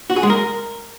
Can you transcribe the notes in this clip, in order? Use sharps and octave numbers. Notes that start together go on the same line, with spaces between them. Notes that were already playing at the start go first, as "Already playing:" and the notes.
F#4
G#4
G#3
A#4